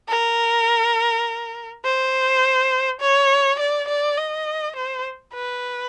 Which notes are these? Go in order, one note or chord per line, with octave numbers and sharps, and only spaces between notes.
A#4
C5
C#5
D5
D5
D#5
C5
B4